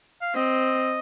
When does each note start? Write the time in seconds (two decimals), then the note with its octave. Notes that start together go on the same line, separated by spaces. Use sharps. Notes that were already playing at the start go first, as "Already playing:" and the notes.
0.21 F5
0.35 C4 D#5